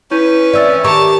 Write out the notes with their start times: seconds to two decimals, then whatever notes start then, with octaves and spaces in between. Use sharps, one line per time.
0.11 C#4 E4 B4 G6 D#7
0.53 E3 C4 D5 E6 A6
0.84 D#3 G4 C#5 A5 A#5 D6